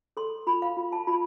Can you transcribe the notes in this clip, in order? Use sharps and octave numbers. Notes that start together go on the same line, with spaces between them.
A4 C6
F4 B5
F5
F4
A5
F4 B5